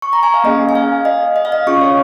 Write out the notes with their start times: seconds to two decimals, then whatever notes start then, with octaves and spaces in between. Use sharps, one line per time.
0.02 C#6
0.13 A#5
0.23 G#5
0.34 F5
0.44 A#3 C#4 G#4 D#5
0.69 G#5
0.75 F5
1.05 D#5
1.36 D#5
1.45 F5
1.52 D#5
1.67 C#4 F4 G#4 C#6
1.81 C#5